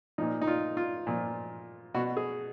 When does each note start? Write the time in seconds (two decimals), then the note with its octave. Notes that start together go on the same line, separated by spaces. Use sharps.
0.18 A#2 F3 D#4
0.42 D#4
0.47 F4
0.77 F4
1.07 A#2 F3
1.95 B2 F#4
2.17 G#4